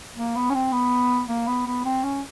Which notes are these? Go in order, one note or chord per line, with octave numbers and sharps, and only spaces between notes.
A#3
B3
C#4
C4
B3
A#3
B3
B3
C4
C#4